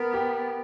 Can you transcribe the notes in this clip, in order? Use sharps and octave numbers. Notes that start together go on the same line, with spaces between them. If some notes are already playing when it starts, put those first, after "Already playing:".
Already playing: B3 A#4
G4